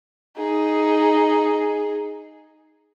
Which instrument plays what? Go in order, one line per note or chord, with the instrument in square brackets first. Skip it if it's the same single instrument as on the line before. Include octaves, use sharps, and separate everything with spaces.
[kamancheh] D#4 G#4